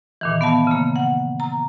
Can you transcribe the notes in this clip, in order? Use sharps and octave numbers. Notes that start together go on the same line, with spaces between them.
A#2 D#3 E3
B3 F5 A5
C#3 A#3
F#5
A#5